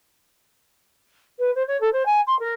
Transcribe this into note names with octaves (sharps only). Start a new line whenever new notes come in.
B4
C5
C#5
A4
C5
G#5
C6
A#4